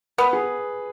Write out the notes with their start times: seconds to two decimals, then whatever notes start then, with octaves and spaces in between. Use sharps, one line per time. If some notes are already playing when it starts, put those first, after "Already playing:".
0.18 B3 B4
0.33 G#4